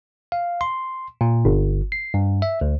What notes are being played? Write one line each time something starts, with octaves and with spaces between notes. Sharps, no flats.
F5
C6
A#2
G1
C7
G2
E5
D2